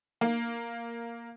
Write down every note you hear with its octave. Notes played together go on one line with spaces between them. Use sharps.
A#3